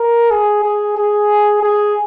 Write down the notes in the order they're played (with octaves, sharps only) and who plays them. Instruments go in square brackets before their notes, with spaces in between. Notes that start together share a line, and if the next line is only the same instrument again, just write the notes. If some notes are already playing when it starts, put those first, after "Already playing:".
Already playing: [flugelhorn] A#4
G#4
G#4
G#4
G#4